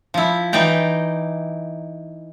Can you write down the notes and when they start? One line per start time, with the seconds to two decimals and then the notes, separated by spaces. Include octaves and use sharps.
0.14 F3 E4
0.53 E3 D#4 D5 G5 A#5